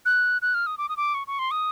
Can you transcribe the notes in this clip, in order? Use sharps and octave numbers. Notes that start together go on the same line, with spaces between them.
F#6
F#6
F6
D#6
D6
D#6
D6
C#6
C#6
C6
D#6